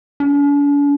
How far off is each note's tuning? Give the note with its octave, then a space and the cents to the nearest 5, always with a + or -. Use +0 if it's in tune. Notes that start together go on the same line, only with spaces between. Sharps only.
D4 -45